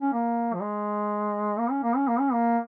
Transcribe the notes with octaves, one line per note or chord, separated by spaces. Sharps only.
C#4
A#3
F3
G#3
A#3
C#4
A#3
C#4
A#3
C#4
A#3